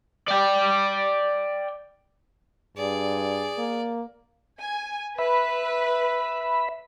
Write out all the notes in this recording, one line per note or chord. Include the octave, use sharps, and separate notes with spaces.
D5 G5
G2 G#4 D5
A#3
G#5
B4 E5 B5